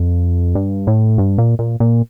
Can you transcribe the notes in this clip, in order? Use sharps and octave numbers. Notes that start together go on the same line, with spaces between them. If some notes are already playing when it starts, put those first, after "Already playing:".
Already playing: F2
G2
A2
G2
A#2
A#2
A#2